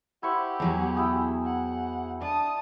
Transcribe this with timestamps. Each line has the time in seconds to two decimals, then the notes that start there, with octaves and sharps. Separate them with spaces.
0.23 E4 G4 C5 F#5 C#6
0.60 E2 F#3 G#4
0.97 E4 G5 D#6
1.45 F#5
2.22 D4 A5 D#6